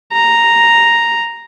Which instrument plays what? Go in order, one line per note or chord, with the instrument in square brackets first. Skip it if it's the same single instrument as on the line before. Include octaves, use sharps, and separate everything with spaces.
[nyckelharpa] A#5